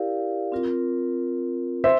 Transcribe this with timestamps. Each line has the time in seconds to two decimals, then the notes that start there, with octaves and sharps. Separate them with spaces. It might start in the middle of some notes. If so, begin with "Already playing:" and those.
Already playing: E4 G4 A#4 D5 F5
0.52 C4 F4 A#4
1.84 C5 E5